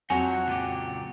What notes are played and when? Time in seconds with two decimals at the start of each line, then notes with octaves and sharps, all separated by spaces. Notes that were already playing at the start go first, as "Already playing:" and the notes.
0.10 F2 F#3 D#4 F#4 C#5 F#5 G#5
0.47 C#2 A#2 G4